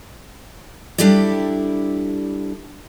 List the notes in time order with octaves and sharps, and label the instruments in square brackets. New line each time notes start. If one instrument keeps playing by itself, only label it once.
[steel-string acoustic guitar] G3 D4 E4 G4 A4 D5